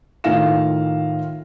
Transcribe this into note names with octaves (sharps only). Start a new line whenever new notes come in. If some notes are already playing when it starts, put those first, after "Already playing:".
A2 D#3 F4 F5 A#6 E7